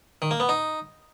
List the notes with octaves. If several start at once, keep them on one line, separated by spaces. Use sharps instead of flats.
D#3
A#3
B3
D#4